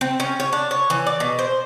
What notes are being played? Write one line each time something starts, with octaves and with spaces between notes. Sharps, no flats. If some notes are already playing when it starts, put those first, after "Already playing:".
C4
C#4
C#5
D4
C#5
E3
D5
B2
C5